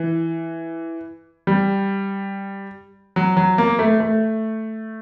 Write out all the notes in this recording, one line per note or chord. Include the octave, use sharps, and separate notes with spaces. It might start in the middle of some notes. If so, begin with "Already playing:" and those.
Already playing: E3
G3
F#3
F#3
A#3
A3
A3